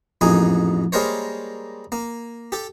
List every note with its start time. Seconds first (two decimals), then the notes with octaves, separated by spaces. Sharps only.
0.21 A1 F2 G#2 A#3 D#4 G#5
0.92 G3 G#3 A#3 A#4 C5 C#5
1.92 A#3
2.52 G4 A4